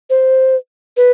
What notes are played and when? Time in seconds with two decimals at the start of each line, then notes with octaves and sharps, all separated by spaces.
0.10 C5
0.97 B4